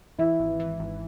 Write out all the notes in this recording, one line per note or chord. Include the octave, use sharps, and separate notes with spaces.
E3 E4
G#1
E3
G#1